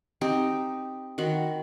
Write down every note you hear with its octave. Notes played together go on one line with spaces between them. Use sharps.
C4 D#4 G4 G5
D#3 F#4 B5 C6